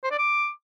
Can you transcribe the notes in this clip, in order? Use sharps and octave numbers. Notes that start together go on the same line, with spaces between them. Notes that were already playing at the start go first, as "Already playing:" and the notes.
C5
D5
D6